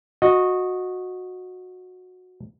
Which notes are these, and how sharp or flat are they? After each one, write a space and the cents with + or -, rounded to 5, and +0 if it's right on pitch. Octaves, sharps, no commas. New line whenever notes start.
F#4 -15 D#5 +0